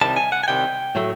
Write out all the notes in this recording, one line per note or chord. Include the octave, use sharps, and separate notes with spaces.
C2 C3 D#3 G3 A5
G#5
F#5
G#5
C2 C3 D#3 G3 G5
A2 F#3 A3